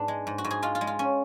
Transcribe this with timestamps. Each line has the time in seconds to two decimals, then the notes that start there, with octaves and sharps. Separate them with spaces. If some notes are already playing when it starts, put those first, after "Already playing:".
Already playing: G#2 B3 D4
0.08 G#3
0.27 G#2
0.38 F#4
0.45 G#2
0.51 G#4
0.62 G#3 F4
0.75 F4
0.81 G#3
0.87 F4
0.99 C#4